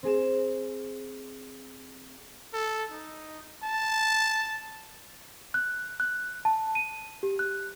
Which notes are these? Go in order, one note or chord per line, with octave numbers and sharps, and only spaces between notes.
C4 G#4 E7
A4
D#4
A5
F#6
F#6
A5
D#7
G4
F#6